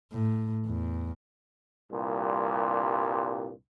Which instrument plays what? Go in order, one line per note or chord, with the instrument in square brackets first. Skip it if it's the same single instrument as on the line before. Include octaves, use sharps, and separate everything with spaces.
[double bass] A2
E2
[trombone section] C2 G2 A#2